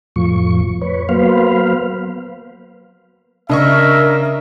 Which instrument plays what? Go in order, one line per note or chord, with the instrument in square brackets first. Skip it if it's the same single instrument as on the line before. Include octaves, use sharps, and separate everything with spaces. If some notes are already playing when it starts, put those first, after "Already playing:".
[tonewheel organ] F2 A2 F3 C#6
B4 C#5
F#3 A#3 B3 B4 C5 F5
[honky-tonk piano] C#3 D#5 C#6 [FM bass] D4 [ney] A#4 [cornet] E5